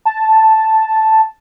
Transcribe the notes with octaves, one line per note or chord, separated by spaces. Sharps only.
A5